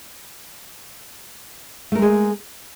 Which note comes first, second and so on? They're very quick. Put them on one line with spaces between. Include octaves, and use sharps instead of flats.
A3 A#4 G#3 G#4